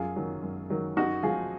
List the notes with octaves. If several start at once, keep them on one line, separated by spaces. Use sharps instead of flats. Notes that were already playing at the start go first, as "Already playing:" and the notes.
Already playing: F#2 F4 G#4
D#3 F#3
F#2
D#3 F#3
F#2 D#4 F#4
F3 F4 G#4